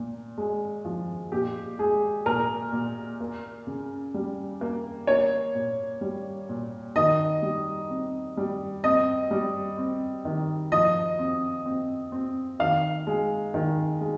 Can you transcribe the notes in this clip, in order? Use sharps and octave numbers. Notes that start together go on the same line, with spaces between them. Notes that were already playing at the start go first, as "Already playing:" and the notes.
Already playing: A#2
G#3
F3
A#2 G4
G#3 G#4
A#2 A#4
A#2
A#3
C#3
G3
A#3
A#3 C#5
A#2
G3
A#2
D#3 D#5
G3
C4
G3
C4 D#5
G3
C4
D#3
F3 D#5
C4
C4
C4
D#3 F5
G#3
D#3
G#3